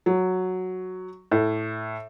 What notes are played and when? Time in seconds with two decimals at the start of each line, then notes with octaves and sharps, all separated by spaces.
0.06 F#3
1.31 A2